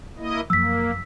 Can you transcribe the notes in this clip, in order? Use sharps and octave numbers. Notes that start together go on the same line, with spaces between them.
A#3 E4 D#5
F#2 F3 F#3 A#3 E6 B6